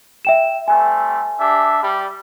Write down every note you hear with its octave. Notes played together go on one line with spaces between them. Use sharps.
E5 G5 E7
G3 A3 C4 G#5
D4 G4 E5
G3